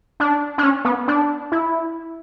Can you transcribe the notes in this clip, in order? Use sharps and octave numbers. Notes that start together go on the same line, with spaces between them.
D4
D4
C#4
B3
D4
E4